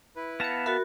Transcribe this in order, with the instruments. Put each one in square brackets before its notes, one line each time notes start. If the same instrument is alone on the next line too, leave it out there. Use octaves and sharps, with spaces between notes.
[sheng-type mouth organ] E4 B4
[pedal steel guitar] B3 F5 A5 [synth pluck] A#6 C#7
[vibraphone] F#4 A#4 [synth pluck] E5 B5 A6